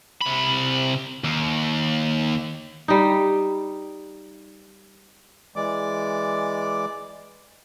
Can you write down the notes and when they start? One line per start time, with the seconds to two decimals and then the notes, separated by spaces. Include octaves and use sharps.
0.21 C3 B5
1.24 D#2
2.88 G3 D#4
5.56 E3 G#3 D5 D6